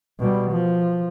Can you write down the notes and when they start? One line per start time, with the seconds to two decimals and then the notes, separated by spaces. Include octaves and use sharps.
0.20 B2 G3
0.51 F3